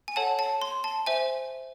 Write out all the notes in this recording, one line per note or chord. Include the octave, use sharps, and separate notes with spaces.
G#5
A4 C#5 F#5 A5
A5
C6
A5
C5 E5 G#5